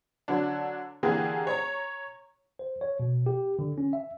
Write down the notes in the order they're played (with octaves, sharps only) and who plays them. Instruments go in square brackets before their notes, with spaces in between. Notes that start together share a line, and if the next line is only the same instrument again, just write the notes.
[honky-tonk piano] D3 F#3 D4
D3 E3 A#3 G4 G#4
C#5 A#5
[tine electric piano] C5
C#5
B2
G4
D3
C#4
E5